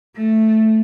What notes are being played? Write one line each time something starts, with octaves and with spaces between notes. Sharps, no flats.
A3